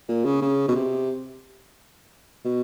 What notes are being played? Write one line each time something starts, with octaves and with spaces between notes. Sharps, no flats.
A#2
C#3
C#3
B2
C3
B2